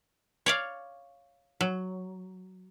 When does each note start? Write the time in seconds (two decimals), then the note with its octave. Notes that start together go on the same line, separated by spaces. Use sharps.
0.46 C#5 D5 F5
1.61 F#3